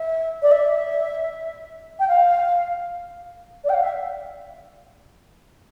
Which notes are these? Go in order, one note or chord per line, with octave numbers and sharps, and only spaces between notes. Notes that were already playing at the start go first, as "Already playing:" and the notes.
Already playing: E5
D5
E5
G5
F5
D5
G5
F5
E5